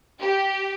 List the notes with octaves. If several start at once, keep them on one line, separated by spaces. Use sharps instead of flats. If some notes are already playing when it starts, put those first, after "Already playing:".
G4